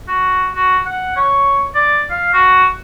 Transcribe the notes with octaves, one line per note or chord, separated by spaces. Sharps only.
F#4
F#4
F#5
C#5
D5
F5
F#4